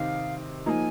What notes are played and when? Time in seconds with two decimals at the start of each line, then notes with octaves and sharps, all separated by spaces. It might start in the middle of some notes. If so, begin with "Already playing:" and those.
Already playing: C3 D#3 C4 D#4 F5
0.66 F3 A#3 D#4 G#5 A#5